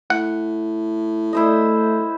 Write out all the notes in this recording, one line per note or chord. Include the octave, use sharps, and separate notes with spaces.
A2 F#5
A3 E4 C5 D#5